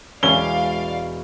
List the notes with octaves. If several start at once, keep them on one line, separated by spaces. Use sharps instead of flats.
E1 C#4 D5 F5 B6 G7